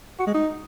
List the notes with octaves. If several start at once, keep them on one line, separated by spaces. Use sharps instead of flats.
F#4
G#3
D#4